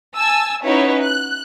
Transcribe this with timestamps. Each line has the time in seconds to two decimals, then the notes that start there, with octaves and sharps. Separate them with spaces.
0.15 G#5 A5 E6
0.66 C#4 D#4 E4 F#4 B4 C#5
1.02 F#6